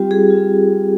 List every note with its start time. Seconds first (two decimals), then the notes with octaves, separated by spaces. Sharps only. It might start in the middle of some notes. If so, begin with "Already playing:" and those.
Already playing: G3 C4 F4 G4
0.11 G3 G#4
0.30 C4 F4